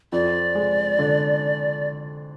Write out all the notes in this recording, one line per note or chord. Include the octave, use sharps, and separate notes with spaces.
F2 D5
G#3
D3